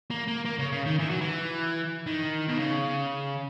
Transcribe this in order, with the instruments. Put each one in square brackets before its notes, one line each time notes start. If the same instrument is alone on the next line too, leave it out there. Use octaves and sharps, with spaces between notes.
[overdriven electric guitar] A#3
A#3
A#3
C#3
C#3
D#3
E3
F#3
E3
D#3
B2
C#3